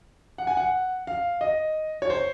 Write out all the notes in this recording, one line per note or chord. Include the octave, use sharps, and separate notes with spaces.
F#5
G#5
F#5
F5
D#5
C#5
C5